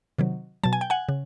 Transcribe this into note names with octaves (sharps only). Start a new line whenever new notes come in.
C3 D#3 F#3
B2 F#3 A5
G#5
G5
F#5 G#5
C#3